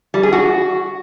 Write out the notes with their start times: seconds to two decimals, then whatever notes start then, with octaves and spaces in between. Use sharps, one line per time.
0.14 G3
0.23 G#4
0.33 F#4